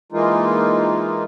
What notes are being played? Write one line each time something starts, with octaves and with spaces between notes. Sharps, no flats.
E3 G#3 A#3 D#4 F4